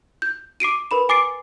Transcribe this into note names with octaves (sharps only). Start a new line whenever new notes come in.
G6
D6 C7 D7 D#7
A#4 B4 B5 E7
G#5 D6 A6 C7 D7